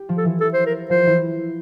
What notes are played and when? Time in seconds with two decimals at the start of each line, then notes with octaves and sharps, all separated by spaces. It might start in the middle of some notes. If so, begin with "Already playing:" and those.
Already playing: G4
0.09 F3 F4
0.17 A4
0.25 E3 E4
0.41 A4
0.53 C5
0.66 A#4
0.90 F3 F4 C5
1.06 E3 E4